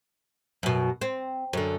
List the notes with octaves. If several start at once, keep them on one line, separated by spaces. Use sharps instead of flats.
F#2 B2
C4
F#2 D3